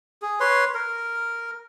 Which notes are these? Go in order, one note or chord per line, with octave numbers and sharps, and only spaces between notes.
G#4
B4 C#5 C6
A#4